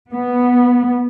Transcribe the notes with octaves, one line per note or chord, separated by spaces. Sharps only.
B3